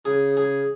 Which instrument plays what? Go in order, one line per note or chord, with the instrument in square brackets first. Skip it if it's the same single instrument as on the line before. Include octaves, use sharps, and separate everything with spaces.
[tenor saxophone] C#3 [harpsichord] G#4
[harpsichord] G#4